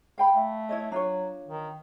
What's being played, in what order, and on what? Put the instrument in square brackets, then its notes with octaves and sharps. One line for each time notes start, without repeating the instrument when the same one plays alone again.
[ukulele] F5 G5 B5
[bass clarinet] A3
[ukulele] E4 C#5 D#5
[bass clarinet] F#3 [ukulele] D4 F4 C#5
[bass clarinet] D#3